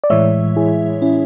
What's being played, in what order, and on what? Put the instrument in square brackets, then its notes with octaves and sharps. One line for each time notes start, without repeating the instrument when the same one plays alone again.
[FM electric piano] D5
A2 E3 G#3 C#5 E5
E4 G#4
C#4 E4